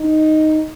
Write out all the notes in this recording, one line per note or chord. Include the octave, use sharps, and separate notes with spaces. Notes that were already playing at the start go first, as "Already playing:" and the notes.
Already playing: D#4